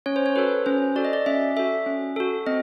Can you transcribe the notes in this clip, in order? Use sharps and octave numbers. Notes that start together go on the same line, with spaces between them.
C#4 C#5
C5
C#5
F#4 A4 B4
C#4 C5
F#4 A4 D5
D#5
D5
C#4 E5
F#4 A4 E5
C#4
F#4 A4
C4 D#5